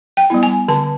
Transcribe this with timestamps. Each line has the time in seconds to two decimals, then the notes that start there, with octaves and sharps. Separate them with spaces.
0.17 G5
0.30 G3 B3 E4
0.43 G#5
0.68 D3 A5